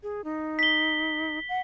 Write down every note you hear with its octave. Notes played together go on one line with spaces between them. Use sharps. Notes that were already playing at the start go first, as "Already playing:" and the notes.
G#4
D#4
B6 G7
F#5